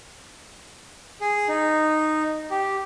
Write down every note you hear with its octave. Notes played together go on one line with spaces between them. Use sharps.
G#4
D#4
G4